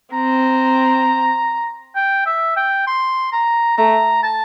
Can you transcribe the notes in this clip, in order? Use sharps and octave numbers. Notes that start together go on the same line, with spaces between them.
C4 A#5
G5
E5
G5
C6
A#5
A3 A#5
A5